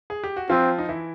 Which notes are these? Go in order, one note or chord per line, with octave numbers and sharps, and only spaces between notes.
G#4
G4
F#4
F3 C4 F4
D#4
E3 E4